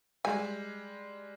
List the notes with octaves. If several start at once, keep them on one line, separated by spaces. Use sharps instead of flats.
G3 G#3 G#5